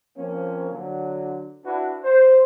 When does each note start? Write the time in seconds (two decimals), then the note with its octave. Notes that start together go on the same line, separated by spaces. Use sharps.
0.17 F3 A#3 C4 C#4
0.71 D3 F#3
1.65 D4 E4 F#4 B4
2.03 C5